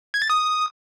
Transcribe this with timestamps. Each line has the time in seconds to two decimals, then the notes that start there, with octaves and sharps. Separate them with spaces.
0.14 G#6
0.22 A6
0.30 D#6